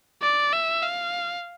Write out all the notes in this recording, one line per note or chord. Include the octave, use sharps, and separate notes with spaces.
D5
E5
F5